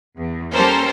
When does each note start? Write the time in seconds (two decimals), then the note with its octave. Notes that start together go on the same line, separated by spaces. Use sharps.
0.19 E2
0.53 G3 A#3 C#4 A4 A#4 C5